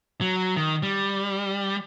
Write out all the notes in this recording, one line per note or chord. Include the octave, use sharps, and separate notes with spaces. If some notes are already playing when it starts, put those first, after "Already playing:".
F#3
D#3
G3